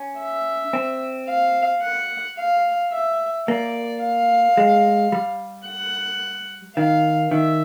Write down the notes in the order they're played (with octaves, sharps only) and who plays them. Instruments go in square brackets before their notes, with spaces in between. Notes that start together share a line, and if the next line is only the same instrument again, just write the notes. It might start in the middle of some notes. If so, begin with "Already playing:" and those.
Already playing: [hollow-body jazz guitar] C#4
[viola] E5
[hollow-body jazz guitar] C4
[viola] F5
F#5
F5
E5
[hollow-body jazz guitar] A#3 [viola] D5
[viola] F5
[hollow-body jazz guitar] G#3
G3
[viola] F#5
[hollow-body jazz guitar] D#3 [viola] F5
[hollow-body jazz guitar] D#3 [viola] E5